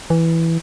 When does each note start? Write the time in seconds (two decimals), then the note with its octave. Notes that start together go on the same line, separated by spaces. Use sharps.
0.10 E3